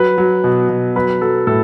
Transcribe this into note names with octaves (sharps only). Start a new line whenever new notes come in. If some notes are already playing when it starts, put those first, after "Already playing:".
Already playing: F#3 B4
F#3
B2
B2
F#3 B4
F#3 A4
A2 A4